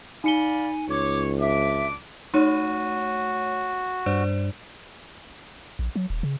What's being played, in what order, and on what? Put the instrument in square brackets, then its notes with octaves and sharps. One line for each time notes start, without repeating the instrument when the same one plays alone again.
[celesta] D#4 C#7 G7 [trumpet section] D5 F5 B5 [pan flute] G#5
[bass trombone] C#2 [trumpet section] C#5 [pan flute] D6
[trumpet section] D4 D6 [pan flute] E5
[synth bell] A3 C#5 D#7 [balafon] D#4 [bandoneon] F#4
[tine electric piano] G2 [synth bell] C5 D5
[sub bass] A#1
F#3
D#1
C#3